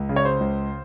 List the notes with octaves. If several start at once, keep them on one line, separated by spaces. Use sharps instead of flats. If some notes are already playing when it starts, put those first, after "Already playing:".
Already playing: C#2
C#3
C#5
C5
C#2